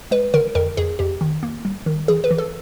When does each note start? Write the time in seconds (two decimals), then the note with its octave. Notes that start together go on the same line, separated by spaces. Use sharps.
0.11 G#3 B4
0.34 D3 A#4
0.55 F2 A#4
0.77 F2 G#4
0.99 F2 G4
1.21 D#3
1.43 A#3
1.65 G3
1.86 D#3
2.08 E3 G#4
2.24 B4
2.31 E3
2.38 A4